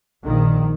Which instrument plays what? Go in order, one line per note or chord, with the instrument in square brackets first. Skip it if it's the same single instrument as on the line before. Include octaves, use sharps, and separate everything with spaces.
[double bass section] A#1 A#2 D#3